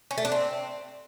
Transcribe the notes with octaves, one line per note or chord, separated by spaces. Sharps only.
C#4
A3
D4
C4